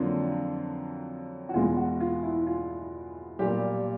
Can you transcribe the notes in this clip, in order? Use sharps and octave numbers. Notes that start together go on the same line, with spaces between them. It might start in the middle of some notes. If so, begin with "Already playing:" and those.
Already playing: F2 D3 F#3 A#3 F4
F#4
E2 B2 G#3 F4
F#4
F4
E4
F4
B1 A#2 G3 A#3 G4